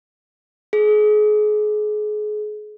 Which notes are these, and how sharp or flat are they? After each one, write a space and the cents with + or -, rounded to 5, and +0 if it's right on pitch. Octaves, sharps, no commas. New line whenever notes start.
G#4 +30